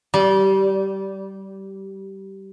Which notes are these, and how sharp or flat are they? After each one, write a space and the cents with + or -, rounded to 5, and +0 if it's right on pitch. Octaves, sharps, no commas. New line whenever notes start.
G3 -20